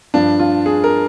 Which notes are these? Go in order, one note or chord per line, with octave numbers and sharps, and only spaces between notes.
G2 F3 D4
F4
G#4
A#4